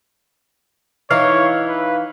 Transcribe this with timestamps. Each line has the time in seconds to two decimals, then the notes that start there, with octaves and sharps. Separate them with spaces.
1.11 E3 D#4 C#5 F5
1.68 B4